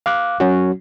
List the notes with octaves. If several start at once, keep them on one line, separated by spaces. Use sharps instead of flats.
F5 D6 F#6
F#3 C#4 F#4